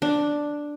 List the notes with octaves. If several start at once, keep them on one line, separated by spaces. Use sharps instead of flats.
D4